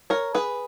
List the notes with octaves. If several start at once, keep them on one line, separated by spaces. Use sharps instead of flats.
A#4 C#5
G#4 B4